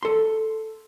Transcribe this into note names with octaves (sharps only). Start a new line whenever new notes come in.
A4 C6